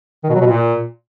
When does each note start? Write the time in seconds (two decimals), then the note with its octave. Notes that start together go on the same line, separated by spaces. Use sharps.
0.24 D#3
0.30 B2
0.35 F#3
0.41 B2
0.47 A#2